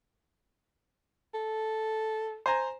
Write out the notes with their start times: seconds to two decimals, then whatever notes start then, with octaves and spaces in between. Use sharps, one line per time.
1.34 A4
2.46 C5 G#5 A#5